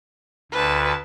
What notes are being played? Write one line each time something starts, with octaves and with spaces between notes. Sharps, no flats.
D2 B4 A5